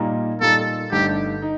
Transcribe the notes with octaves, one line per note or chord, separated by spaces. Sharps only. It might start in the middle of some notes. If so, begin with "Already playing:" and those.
Already playing: A#2 G3 A#3 D#4
A#2 G3 A#3 D#4 A4
G1 G2 D3 A3 D#4 G4
D#4